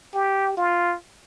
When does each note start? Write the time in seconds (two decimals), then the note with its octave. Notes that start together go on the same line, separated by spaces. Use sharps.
0.14 G4
0.57 F4